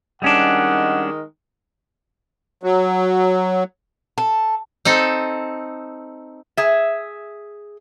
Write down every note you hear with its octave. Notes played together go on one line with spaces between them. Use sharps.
D#3 G3 G#3 C#4 D4 A#4 F#5
F#3
A4
C4 D#4 A4
G#4 E5